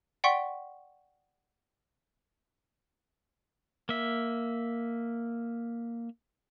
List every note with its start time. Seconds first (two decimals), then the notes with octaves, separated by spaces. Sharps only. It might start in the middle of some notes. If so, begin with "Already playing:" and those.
0.24 D5 F#5 G5 C6 C#6 B6
3.89 A#3 E5